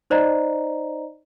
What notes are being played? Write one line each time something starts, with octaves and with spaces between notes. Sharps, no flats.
D#4 C5 D5 D#5 A#5